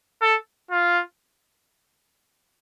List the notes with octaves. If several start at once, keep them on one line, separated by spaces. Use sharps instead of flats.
A4
F4